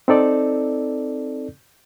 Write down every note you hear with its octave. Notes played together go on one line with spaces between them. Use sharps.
C4 D#4 A4 D5